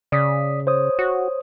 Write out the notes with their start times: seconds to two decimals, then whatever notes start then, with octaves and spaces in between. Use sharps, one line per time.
0.12 C#3 D5 D#6 B6
0.67 C5 C#5 D#6
0.99 F#4